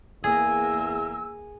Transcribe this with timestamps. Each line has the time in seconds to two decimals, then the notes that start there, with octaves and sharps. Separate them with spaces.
0.24 E2 A#3 G#4 A#4 E6